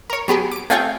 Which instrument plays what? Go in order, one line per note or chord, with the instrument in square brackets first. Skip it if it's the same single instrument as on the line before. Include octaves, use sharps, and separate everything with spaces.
[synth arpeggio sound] A#4 C#5
F#3 B3 G4 G#4
D6 D7
A3 C4 F4 G#4 C#5 G5